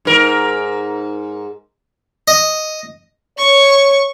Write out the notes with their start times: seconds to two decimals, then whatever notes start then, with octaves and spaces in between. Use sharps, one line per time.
0.05 G#2 A#4
2.28 D#5
3.38 C#5 C#6